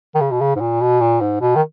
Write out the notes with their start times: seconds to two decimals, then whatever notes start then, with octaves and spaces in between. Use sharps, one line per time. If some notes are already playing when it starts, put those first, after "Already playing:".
0.15 D#3
0.21 C#3
0.31 B2
0.41 C#3
0.56 G#2
0.60 A#2
0.81 B2
1.01 A#2
1.21 G#2
1.41 B2
1.56 D#3